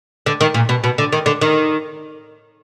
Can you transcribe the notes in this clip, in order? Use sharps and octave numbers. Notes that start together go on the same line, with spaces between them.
D3
D#3
A#2
B2
B2
D3
D#3
D3
D#3